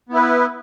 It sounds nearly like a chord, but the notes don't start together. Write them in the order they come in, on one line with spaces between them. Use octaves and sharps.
B3 E4 B4